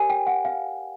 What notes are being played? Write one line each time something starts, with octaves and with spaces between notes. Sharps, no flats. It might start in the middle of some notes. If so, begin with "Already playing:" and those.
Already playing: G4 A#4 C#5 G#5
G5
F#5
F5